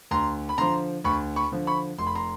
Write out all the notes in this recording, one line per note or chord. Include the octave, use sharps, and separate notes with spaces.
D2 A#5 C6
B5
D3 F3 A#5 C6
D2 B5 C#6
B5 C#6
D3 F3
B5 C#6
F1 C6
B5
A#5 C6